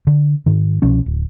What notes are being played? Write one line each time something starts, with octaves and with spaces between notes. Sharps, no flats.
D3
G#2 D#3
C2 B2 F3 C#4
D1